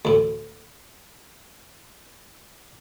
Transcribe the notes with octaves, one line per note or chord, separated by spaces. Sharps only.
D2 A2